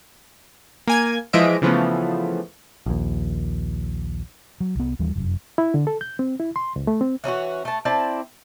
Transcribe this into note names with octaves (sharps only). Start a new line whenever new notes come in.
A#3 G#5 G#6
E3 F3 G#3 D#5 E5 D7
C#3 E3 F3 A3 B3
A#1 D#2
F#3
C2 B3
D#2 E3 G3
F1 F#2
E4
D3
A4
G6
C4
E4
C6
C#2
A3
C4
E3 C#4 D#4 F#4
A3 A5
C4 E4 D5 A5